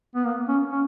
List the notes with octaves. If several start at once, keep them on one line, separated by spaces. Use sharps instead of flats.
B3
A#3
C#4
C#4